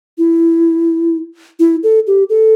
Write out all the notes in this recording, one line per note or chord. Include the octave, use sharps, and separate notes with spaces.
E4
E4
A4
G4
A4